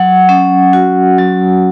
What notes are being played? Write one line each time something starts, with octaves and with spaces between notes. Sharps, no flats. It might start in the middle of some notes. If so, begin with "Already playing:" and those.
Already playing: F#3 F#5
C#4
F#4
F#3